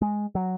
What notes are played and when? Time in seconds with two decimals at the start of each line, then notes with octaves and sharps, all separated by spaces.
0.02 G#3
0.35 F#3